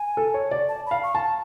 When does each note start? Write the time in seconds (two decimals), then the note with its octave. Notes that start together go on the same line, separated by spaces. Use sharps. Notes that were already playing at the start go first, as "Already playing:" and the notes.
Already playing: G#5
0.17 A4
0.34 C#5
0.51 D5
0.69 A5
0.86 F5 B5
1.03 C#6
1.15 A5